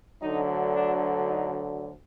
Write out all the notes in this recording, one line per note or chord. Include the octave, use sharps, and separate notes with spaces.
D2 D3 F#3 D#4
D4
D#4